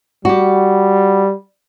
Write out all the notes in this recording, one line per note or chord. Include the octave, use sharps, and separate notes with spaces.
G3 F#4 G4